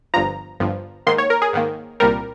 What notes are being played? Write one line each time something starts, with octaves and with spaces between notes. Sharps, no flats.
G1 G2 F3 A#5
G1 G2 F3
G#2 D#3 A#3 C6
C#5
A#4
G#4
G#2 D#3 A#3
C2 A#2 G3 A#4